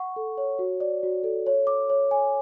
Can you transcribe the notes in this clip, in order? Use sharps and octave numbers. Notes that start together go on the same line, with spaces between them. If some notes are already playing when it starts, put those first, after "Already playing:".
Already playing: F#5 C#6
A4
C#5
F#4
D5
F#4
A4
C#5
D6
C#5
G#5